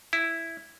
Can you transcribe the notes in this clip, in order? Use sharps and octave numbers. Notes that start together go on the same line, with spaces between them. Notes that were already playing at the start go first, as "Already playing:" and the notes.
E4